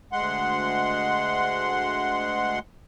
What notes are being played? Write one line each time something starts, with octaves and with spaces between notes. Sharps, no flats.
D2 G#3 F#5 C6